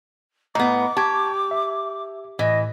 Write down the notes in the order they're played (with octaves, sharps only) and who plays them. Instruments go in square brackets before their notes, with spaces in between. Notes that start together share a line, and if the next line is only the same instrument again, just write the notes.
[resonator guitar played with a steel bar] A2 B3 [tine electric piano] D#5 A#5 [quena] D6
[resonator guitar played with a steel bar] G4 [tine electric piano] A5 C#6 G#6
[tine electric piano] E5
[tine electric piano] A2 [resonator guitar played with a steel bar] E3 [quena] D#5